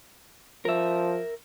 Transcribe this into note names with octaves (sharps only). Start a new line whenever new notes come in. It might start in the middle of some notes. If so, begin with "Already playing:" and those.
F3 A#4 E5